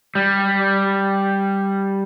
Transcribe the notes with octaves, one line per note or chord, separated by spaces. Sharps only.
G3